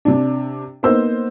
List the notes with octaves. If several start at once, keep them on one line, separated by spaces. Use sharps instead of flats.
C3 D4
A#3 B3 D#4 C5 E6